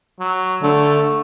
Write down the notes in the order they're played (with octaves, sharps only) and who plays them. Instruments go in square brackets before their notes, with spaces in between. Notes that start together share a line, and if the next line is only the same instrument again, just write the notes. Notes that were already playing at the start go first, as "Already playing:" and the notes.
[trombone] F#3
[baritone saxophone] D3 [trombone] A3